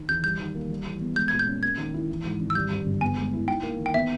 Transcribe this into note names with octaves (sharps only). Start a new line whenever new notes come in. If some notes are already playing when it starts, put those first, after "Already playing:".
Already playing: D#3
E2 G6
G3 G6
D#3
A#3
G3
E3
B3
G#3 G6
A#2 G#6
G6
C#4
A#3 G#6
D#3
E4
E3
G#2
G#1
E6
G3 G6
G2
G1
B3 G#5
G#3
E4
D#4 G5
A#3
D#3
G5
B3 E5